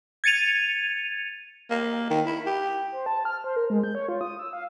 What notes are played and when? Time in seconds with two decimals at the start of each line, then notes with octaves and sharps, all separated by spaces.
0.24 G#6 A6 C#7 D#7 F7
1.71 A#3
2.10 D#3
2.26 E4
2.46 G4
2.92 C5
3.06 A5
3.25 F6
3.44 C5
3.56 A#4
3.70 G#3
3.83 G6
3.95 C#5
4.09 F4
4.21 D#6
4.39 E6
4.53 F5